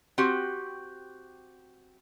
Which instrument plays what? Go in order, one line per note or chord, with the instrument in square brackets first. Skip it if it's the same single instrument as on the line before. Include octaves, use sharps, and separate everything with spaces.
[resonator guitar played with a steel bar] C4 F#4 G4